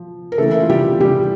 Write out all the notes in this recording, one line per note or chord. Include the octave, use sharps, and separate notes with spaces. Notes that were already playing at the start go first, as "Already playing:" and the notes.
Already playing: F3
A#4
C#3 E3 A3 A#3 A4
E4
F4
G3 G4
G3 G4